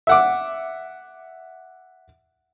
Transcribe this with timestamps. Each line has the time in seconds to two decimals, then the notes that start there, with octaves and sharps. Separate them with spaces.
0.07 E5 F#5 D6